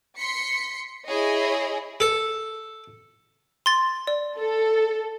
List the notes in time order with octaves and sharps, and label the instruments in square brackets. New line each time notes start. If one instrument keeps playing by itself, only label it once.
[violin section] C6 B6 C#7
E4 G#4 C#5 D#5
[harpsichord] A4
[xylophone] C6 A6
D5
[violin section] A4